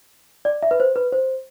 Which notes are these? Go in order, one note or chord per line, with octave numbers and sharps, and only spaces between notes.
D5
E5
B4
C5
B4
C5